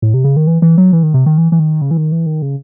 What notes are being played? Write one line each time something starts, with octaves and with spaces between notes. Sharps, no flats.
A2
C3
C#3
D#3
E3
E3
F#3
E3
D#3
C3
D#3
E3
E3
D#3
C#3
E3
D#3
E3
D#3
C#3